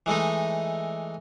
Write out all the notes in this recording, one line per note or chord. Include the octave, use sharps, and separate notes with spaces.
E3 G#3 A3 D#4